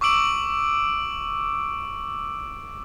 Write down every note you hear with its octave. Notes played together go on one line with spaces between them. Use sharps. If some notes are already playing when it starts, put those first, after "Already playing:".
C#6 D6 E6 D7 F#7